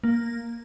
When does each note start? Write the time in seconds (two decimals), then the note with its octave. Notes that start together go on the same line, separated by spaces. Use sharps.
0.04 A#3